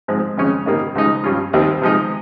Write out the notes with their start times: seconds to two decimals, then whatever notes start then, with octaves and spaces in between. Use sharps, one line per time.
0.08 G#2 F3 G#3 C4
0.37 F2 C#3 G#3 C#4
0.66 G#2 D#3 G3 A#3 D#4
0.95 C#2 C#3 F3 G#3 D#4
1.24 G2 G3 C#4 F4
1.53 D#2 D#3 G3 C4
1.82 C3 F3 G#3 D#4